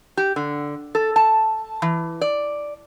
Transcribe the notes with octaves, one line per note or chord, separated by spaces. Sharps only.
G4
D3
A4
A5
E3
D5